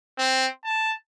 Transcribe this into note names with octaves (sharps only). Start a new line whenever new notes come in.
C4
A5